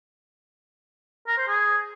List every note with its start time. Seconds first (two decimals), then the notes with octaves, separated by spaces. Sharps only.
1.28 A#4
1.38 C5
1.48 G#4